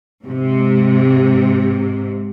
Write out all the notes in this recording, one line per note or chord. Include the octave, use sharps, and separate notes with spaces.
G#2 C3